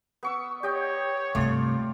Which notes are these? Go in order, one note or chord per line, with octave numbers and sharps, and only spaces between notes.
B3 C#6 E6
G4 C#5 D#5 G5
G2 C3 A3 F4 D5